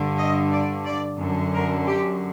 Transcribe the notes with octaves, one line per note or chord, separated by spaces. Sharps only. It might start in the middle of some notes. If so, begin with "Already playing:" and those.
Already playing: G2 D3
D#5
D5
D5
F#2 D3
A#4
G4